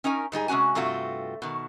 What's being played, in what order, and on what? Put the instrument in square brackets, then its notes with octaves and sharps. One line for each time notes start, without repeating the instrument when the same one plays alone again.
[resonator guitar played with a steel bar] C#4 D#4 A#4 G#5
G#2 G3 D#4 G#4
C3 G#3 C#4 F#4 G#5
G2 C3 A3 F4 F#4
B2 D#3